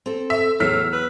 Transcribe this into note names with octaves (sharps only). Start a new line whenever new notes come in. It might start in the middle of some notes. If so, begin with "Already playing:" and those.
C4 A4
E5
E2 A2 F#3 E6 F6 B6
B4